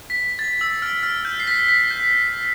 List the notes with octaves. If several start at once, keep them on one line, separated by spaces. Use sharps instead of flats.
B6
A6
E6
F6
F6
G6
C7
B6
B6
G6